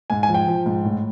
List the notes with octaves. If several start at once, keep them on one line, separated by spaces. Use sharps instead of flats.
G#2 G#5
G#5
F3
G5
F3
G#2
A2